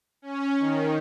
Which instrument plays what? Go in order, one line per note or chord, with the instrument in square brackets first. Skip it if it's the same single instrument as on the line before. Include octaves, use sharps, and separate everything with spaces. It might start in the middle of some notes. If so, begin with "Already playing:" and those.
[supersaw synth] C#4
D#3